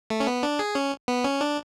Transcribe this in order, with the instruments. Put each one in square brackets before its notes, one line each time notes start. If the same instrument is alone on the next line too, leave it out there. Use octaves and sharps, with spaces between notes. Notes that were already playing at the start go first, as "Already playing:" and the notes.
[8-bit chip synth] A3
C#4
B3
D4
G#4
C#4
B3
C#4
D4